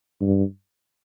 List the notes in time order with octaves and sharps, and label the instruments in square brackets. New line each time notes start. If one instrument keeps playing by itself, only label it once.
[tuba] G2